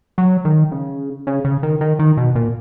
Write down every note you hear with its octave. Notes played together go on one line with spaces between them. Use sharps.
F#3
D#3
C#3
C#3
C#3
D#3
D#3
D#3
B2
A#2